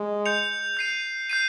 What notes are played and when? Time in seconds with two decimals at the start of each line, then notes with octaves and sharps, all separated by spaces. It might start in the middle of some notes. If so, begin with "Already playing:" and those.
Already playing: G#3
0.26 G6 C#7 F7
0.77 G6 C7 D#7
1.29 G6 C7 D#7